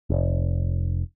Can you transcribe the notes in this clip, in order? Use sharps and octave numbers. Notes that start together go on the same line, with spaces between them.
F1